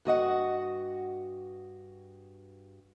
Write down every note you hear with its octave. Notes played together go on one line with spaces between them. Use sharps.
G2 F#4 D#5 F#5